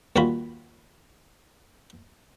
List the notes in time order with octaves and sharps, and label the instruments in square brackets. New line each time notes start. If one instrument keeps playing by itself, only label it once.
[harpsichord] D#2 G3 F4 F#4 B5